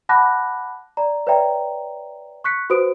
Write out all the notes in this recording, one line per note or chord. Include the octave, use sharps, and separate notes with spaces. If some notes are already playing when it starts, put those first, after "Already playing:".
F#5 A5 B5 D6 F#6 A#6
D5 A#5
B4 C#5 D5 E5 G5 A#5
C#6 F#6 B6 C#7
F#4 B4 C5 D#6 D7